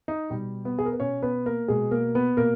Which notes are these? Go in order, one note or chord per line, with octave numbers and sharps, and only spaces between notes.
D#4
B2 G3 G4
B3 B4
G#4
A#4
B4
B2 C#4 C#5
B3 B4
A#3 A#4
B2 G#3 G#4
A#3 A#4
B3 B4
B2 A#3 A#4